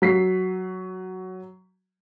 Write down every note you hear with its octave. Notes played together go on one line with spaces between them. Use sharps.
F#3 B6 C7